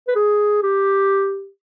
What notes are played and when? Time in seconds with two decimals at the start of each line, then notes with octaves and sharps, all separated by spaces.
0.08 B4
0.16 G#4
0.63 G4